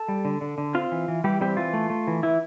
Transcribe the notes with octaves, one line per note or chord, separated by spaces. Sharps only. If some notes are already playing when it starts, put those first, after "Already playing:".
Already playing: A4 A5
G3
D3
D3
D3
C4 F4 F5
E3
E3
E3 G3 G4
G3 C4 G4
E3 F4
A3
A3
E3
E3 E4